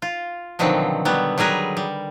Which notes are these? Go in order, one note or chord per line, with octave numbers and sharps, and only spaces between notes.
F4
B2 D3 D#3 F3 F#3 C4
F#3 G3 B3
F#3 G3 G#4 A#4 B4
G3